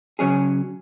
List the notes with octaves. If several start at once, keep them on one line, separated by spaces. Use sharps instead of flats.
C#3 F#3 C#4 G#4